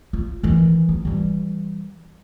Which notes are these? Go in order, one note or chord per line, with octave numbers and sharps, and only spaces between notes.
F4
D#3 E3
C4
E3 G3